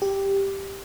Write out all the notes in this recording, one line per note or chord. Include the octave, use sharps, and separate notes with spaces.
G4